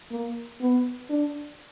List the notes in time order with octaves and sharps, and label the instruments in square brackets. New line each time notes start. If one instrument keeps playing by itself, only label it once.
[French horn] A#3
B3
D4